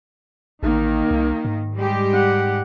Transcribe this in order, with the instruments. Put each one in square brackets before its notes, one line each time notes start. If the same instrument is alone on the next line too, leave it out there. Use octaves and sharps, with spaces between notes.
[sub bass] A1 [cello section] D#3 [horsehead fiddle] A#3 D#4
[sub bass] C2
G#2
[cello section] G3 G#3 G4
[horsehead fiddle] F#5